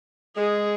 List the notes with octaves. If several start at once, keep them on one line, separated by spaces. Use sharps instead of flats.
G#3 G#4